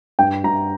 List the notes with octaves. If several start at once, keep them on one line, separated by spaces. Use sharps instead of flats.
G2 G5
G2 A#5